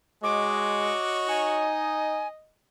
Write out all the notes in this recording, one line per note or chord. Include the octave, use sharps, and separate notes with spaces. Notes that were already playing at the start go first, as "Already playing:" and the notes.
G#3 F#4 C#5 D#5 D6
D#4 G#5